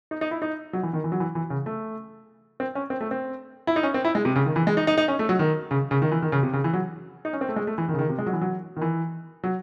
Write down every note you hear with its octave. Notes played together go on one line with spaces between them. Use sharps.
D#4
D#4
E4
D#4
F#3
E3
D#3
E3
F#3
E3
E3
C#3
A3
C4
C#4
C4
A3
C4
E4
D#4
C#4
C4
E4
G#3
C3
C#3
D#3
E3
G#3
D#4
D#4
D#4
C#4
A3
F#3
D#3
C#3
C#3
D#3
E3
D#3
C#3
C3
C#3
E3
F#3
D#4
C#4
C4
A3
G#3
A3
E3
D#3
C#3
D#3
C3
G#3
F#3
E3
F#3
D#3
E3
F#3